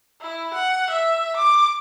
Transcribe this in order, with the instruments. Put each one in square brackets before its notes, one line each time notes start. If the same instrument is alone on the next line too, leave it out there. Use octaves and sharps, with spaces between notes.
[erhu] E4
F#5
E5
D6